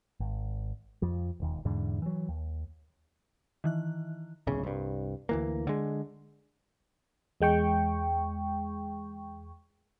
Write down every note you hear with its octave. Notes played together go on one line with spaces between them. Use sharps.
G#1
F2 F3
E1 D#2
E2 G#2 D3
E3 F#3
D#2
D#3 E3 F#6
D1 B1 C#3
C2 G2
D2 E3 A#3
D3 G#3
E2 G#3 G5 C#6